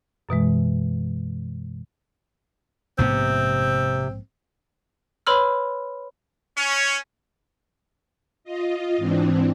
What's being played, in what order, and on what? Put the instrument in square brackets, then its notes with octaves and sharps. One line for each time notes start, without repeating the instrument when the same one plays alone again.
[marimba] F#2 B2 E3 G#3
[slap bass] A#1 G#2 B3 [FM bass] C3 [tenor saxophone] C4
[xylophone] B4 C#5 B5 C6 E6 F6
[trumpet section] C#4
[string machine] F4 D#5
G#2 E3 C4 D4